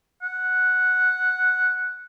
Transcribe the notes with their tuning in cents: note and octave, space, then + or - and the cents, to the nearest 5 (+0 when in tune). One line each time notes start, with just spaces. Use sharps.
F#5 -5